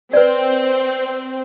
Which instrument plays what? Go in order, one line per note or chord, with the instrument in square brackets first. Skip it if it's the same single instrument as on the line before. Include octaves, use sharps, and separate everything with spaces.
[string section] C4 [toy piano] B4 D5